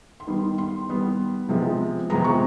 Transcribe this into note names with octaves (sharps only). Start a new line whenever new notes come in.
C6
D#3 G3 B3 B5
C6
D#3 G3 B3
C3 F3 G#3 B3
C3 F3 G#3 B3 A#5
C#6